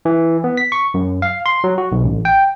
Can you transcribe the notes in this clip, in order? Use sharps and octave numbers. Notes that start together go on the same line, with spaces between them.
E3
B3
B6
C#6
F#2
F5
C6
F#3
F#4
B1
A1
G5